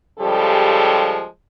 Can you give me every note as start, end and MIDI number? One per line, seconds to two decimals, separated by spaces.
0.19 1.24 49
0.19 1.24 53
0.19 1.24 55
0.19 1.24 56
0.19 1.24 67
0.19 1.24 69